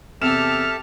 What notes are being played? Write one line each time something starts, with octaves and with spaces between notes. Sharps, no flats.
E2 C3 G4 A4 E5 A5 F6 E7